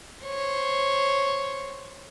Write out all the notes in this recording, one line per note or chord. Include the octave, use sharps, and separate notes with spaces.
C5 C#5